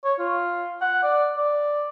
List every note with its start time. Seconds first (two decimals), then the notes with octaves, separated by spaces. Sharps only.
0.04 C#5
0.19 F4
0.81 F#5
1.03 D5
1.37 D5